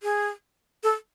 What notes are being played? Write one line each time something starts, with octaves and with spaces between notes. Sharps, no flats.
G#4
A4